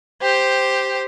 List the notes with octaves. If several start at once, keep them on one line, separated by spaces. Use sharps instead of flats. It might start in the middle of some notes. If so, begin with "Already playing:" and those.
G4 C5